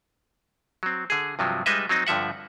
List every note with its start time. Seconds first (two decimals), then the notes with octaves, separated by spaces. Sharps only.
0.83 F#3 C4
1.10 D3 G#4
1.39 G2 C3 F3 F#3
1.66 G3 G#3 D#4 B4 D#5 E5
1.89 F#3 C4 D#4
2.07 G2 D3 F3 E5 F#5